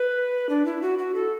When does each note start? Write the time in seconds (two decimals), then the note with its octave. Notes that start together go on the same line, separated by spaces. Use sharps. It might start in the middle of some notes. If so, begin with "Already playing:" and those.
Already playing: B4
0.49 D4
0.66 E4
0.82 F#4
0.98 F#4
1.15 A4